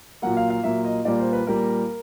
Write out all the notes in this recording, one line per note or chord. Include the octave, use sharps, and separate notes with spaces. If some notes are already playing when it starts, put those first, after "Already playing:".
A#2 F#3 A#3 F#5
F5
F5
A#2 F#3 A#3 E5
D#5
A#2 G3 A#3 D5
C5
B4
A#2 G3 A#3 A#4